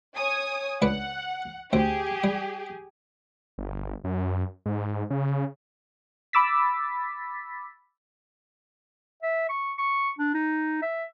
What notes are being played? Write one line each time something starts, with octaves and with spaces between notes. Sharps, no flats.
C#5 G#5 D#6
C#2 D4 B4 F#5
D2 C4 G4 G#4
G3
G1
F#2
G#2
C#3
B5 D6 E6 A6 B6
E5
C#6
C#6
D4
D#4
E5